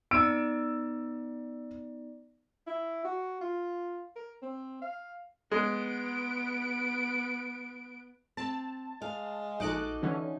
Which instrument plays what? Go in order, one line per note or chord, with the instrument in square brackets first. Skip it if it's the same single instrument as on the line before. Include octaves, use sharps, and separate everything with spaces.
[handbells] B3 D#4 D5 [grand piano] E6 D7
[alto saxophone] E4
F#4
F4
A#4
C4
F5
[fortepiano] G#3 [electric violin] B3 D7
[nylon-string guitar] C4 [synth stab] A5
[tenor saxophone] G#3 [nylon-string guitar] F5
[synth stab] A#1 D6 F#6 [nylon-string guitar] D#4 F#4 A4
[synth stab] D3 E3 C#4